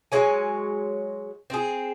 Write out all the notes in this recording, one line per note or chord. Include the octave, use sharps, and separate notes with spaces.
F#3 G#3 C#5 G#5
C4 G#4